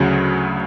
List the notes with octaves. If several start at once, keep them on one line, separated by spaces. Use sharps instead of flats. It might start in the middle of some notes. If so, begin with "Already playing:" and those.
Already playing: D2 C#3 F#3